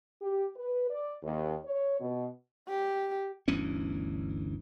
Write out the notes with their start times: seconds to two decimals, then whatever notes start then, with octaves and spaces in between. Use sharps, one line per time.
0.21 G4
0.56 B4
0.90 D5
1.23 D#2
1.65 C#5
2.00 B2
2.68 G4
3.48 G1 D2 E3 C#4